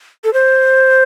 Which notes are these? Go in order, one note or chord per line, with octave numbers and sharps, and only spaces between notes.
A4
C5